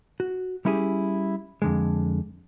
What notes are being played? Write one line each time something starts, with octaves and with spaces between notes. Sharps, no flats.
F#4
G3 C#4 E4 G4 G#4
F2 D3 G#3